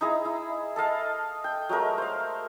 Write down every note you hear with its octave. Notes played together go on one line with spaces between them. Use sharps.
D#4 E4 G#4 A#5
E4
A4 D#5 F5 A5
G5
F#3 G#3 A3 A#4
C5 F5